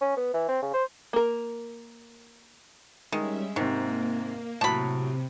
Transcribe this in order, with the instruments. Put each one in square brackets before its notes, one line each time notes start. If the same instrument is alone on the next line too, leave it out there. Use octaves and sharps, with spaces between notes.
[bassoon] C#4
B3
E3
C4
C#3
C5
[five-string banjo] A#3 A#4
[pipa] D#3 [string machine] G3 C#4 E5 [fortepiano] G#3
[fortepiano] G#2 C3 [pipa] D#3 [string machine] A#3
[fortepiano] A2 F#3 [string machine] C3 [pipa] A5 B5